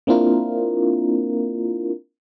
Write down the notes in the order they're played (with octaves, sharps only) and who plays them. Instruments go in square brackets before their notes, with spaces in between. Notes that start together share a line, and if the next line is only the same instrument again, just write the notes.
[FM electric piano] A#3 C4 D4 E4 F4 A#4